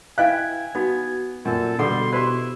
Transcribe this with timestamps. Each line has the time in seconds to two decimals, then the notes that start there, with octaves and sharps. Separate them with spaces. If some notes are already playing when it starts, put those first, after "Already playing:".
0.18 E4 B4 D#5 F5 G5 G#5 F#6
0.75 B3 D#4 F#4
1.45 F#2 A#2 A4
1.79 B2 D3 G3 G#4 A4 F#5 C6
2.13 E4 G4 B4 C5 C6